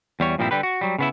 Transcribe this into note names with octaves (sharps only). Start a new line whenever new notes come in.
E2 G3 C#5
G2 A#2 F3 G3 C4 E4
D3 G3 G4 B4
F#4
F#3 G3
C#3 B3 E4